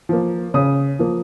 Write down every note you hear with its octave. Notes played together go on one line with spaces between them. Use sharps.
F3 A#3
C#3 D#6
F3 A#3